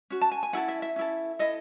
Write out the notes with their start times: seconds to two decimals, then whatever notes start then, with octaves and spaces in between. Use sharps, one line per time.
0.10 C#4 F#4
0.21 A5
0.32 G#5
0.43 G#5
0.53 C#4 E4 A4 F#5
0.68 E5
0.82 E5
0.96 C#4 E4 A4
1.39 E4 A4 D#5